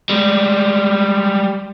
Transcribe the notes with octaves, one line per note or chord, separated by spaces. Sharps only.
G3 G#3